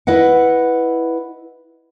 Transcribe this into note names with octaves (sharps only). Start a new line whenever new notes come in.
E4 B4 D#5 F#5